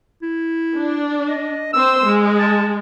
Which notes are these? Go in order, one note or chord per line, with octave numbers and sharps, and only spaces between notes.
E4
D4
D#5
C4 C5 E6
G#3
A5